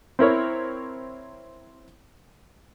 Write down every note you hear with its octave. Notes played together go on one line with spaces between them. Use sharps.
C4 E4 A#4 C#5